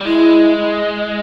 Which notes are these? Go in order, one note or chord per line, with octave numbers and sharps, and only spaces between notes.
G3
G#3 E4